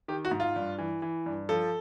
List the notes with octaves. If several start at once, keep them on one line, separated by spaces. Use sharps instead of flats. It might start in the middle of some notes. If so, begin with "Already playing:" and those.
D#3 G4
F#4
G#2
F4
G2
E3
E3
G2
F3 A4